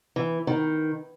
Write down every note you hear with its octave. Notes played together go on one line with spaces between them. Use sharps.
E3
D#3